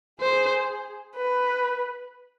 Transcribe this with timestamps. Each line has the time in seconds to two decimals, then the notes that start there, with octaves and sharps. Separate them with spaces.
0.21 G#4 C5
1.15 B4